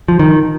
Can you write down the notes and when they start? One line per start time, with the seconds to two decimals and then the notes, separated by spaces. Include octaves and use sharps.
0.08 F3
0.19 D#3